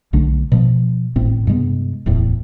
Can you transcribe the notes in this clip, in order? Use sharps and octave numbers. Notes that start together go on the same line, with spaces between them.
B1 D3 A3 D4
B2 F3
G#1 A2 C4
G2 C3 G#3 B3
D1 E2 A2